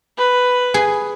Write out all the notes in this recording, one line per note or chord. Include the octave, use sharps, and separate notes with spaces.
B4
G#4